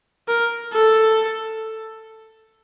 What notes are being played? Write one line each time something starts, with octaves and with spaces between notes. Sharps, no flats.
A#4
A4